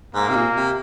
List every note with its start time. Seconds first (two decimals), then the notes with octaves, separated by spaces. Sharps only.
0.15 G#2 A#3
0.29 C3
0.36 A#2
0.56 C3